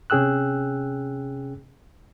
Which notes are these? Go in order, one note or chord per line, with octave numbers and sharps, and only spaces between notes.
C3 C#4 G#4 G5 E6 F#6